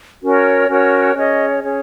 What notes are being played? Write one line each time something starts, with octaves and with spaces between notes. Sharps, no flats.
C#4 F#4 A#4 C#5
C#4 F#4 A#4 C#5
C#4 G#4 C#5 D#5
C#4 G#4 C#5